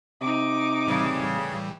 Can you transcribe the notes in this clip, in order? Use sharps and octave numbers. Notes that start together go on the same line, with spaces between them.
C3 D#4 D6
A2 C#3 E3 G3